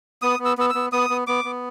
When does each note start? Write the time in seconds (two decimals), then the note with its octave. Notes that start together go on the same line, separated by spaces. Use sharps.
0.22 B3 D#6
0.39 B3
0.45 E6
0.58 B3 E6
0.70 B3 E6
0.92 B3 D#6
1.10 B3
1.27 B3 D6
1.44 B3